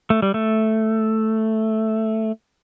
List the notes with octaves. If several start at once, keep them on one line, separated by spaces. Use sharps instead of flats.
A3
G3
A3